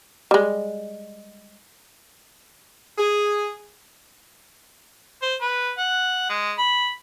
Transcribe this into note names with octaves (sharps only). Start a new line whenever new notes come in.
G3 G#3
G#4
C5
B4
F#5
G#3
B5